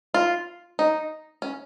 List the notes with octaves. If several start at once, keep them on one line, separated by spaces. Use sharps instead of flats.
F4
D#4
C#4